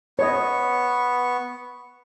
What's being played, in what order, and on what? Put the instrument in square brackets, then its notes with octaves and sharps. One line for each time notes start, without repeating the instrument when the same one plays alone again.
[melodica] B3 C#6 [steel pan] C#5 D#5